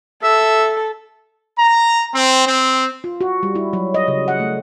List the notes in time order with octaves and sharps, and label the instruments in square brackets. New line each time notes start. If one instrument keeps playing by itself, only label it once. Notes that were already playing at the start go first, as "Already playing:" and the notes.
[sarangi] A4 [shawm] E5
[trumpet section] A#5
C4
C4
[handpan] F4
F#4
G3
E4
F#3
D#5
C#3
F#5
A3